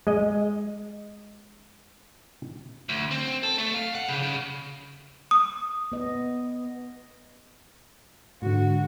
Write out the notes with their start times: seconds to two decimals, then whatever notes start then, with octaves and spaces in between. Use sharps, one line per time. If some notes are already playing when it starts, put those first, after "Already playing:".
0.07 G#3 D#5
2.89 D2
3.11 C4
3.43 A4
3.58 A3
3.74 F5
3.95 F#5
4.08 C#3
4.23 C#3
5.31 D#6
5.92 B3 D#5
8.42 G#2 D3 F#4